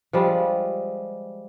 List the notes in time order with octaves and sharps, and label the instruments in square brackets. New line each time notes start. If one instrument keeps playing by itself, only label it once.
[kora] F3 G3 G#3